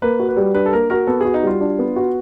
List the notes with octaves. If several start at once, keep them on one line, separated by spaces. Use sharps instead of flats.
A#3 B4
F#4
B4
G3
D4 B4
A4
A#3 A#4
F#4 A#4
B3 A4
F#4 G#4
D#4
G3 F4
D4
B3
F#4